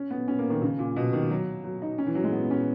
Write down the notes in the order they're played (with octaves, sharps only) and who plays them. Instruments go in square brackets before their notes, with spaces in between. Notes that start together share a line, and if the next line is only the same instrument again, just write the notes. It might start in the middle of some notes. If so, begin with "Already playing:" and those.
Already playing: [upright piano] C#4
B3
C#4
A#3
D#3
C#3
A#2
B2
D#3
F#3
F#3
D#4
C#4
E3
F#3
G#3
B3
B3
C#4